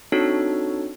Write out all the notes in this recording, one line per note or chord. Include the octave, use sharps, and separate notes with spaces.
C4 D4 D#4 F#4 A4 C#5